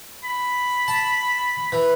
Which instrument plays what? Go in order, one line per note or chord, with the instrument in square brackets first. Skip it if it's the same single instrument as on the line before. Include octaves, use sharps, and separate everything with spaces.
[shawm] B5
[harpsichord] A5
E3